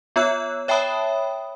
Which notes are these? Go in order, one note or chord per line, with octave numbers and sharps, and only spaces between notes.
B3 F4 C#5 E6 F#6
C#5 E5 G5 A5 B5 D#6